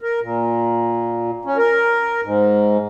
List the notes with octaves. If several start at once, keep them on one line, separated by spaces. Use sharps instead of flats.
A#4
A#2
C#4
A#4
G#2